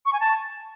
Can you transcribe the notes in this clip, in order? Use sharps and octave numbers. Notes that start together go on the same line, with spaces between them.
C#6
G#5
A5